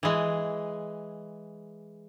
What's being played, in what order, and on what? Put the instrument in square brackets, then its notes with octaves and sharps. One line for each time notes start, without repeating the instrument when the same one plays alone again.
[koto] E3 G#3